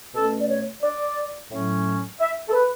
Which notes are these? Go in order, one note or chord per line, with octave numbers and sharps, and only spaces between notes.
B2 A3 C#4 A4
D5
C#5
D5
A2 F#3 C#4
E5
A4
B4